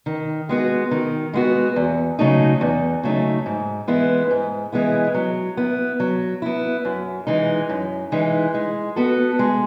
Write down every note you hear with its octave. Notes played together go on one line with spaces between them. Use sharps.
D#3
G#3 B3 F#4
D#3
G#3 B3 F#4
E2
C#3 F#3 A3 D#4
E2
C#3 F#3 A3 D#4
G#2
E3 G#3 B3 E4
G#2
E3 G#3 B3 E4
F#3
B3 E4
F#3
B3 E4
F#2
E3 G#3 D#4
F#2
E3 G#3 D#4
G#3
B3 F#4 A4
G#3